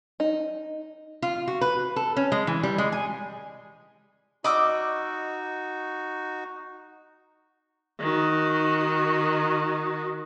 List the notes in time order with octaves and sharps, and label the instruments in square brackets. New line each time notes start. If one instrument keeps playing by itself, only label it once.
[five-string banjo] D#4
[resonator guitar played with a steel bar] F4
F#4
B4
A4
C#4
G#3
E3
G3
G#3
G#5
[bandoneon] D#4 F#4 [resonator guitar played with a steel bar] D#5 [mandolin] B5 D6 E6
[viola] D#3 F#4